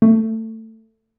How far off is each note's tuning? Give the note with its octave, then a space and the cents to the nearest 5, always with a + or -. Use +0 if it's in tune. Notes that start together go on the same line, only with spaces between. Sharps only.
A3 +20